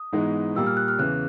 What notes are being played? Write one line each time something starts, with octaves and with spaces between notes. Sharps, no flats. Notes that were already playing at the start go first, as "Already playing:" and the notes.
Already playing: D#6
G#2 E3 G#3 B3 D#4
A#2 G3 A#3 E6
F6
F#6
F6
E2 C#3 E3 F#6